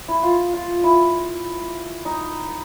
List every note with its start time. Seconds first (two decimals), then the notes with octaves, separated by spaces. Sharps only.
0.08 E4
0.23 F4
0.54 F4
0.84 E4
2.05 D#4